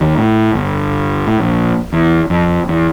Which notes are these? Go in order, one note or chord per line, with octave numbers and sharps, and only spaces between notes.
D#2
A2
G1
A2
A#1
E2
F2
E2